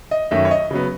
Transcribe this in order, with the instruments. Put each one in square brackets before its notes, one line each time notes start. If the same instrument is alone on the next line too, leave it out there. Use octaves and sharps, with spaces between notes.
[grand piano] D#5
F#2 D#3 A3 C#4 E5
C#5
D#5
C#3 F#3 B3